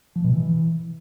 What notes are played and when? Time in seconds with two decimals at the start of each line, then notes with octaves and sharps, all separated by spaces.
0.16 F3
0.24 B2
0.33 E3